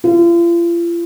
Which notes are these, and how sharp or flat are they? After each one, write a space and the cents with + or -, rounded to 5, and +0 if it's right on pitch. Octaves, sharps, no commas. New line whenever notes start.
F4 -40